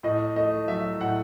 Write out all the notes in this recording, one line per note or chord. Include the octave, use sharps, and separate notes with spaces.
A2 D#5
A3 D#5
F#3 E5
A2 F#5